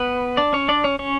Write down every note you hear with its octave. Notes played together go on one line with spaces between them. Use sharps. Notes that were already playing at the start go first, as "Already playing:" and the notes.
Already playing: B3 B4
D4 D5
C#4 C#5
D4 D5
C#4 C#5
C#4 C#5